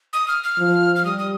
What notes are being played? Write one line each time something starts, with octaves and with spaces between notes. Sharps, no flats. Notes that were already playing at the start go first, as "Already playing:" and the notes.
D#6
F6
F6
F3
F6
G3 D#6
D#6